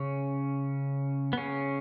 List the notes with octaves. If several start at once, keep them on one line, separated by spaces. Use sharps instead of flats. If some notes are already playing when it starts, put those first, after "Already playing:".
Already playing: C#3 C#4
B3
C#3 C#4